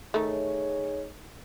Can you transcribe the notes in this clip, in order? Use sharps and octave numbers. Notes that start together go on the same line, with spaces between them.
D#3 A3 D#4 G#4 C#5